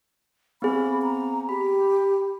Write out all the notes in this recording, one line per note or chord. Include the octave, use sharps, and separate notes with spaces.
B3 C4 G#4 B5
A#5
G4 B5